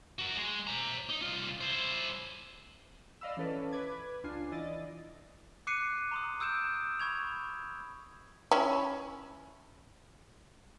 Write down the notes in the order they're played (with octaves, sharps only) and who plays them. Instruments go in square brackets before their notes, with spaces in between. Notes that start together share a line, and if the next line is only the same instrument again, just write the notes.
[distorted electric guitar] F#4 A#4
G#3
C5 A#5
D#4
C2 F4
E4 C5
[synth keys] D5 D#5 F5 B5 E6
E3 C#4 A4 B4 D5
B4 B5 D6 G#6
C#2 D4 F4 G#5 C7
E3 E4 D5 D#5 A6
[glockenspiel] D6 F#6 C7 C#7 D#7
A#5 C6 D#6
D#6 E6 G6 D7 E7
B5 C#6 G#6 F7
[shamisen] C#4 E4